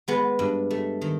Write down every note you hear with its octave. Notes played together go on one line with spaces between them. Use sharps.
G#3 B3
G2
A3
D#3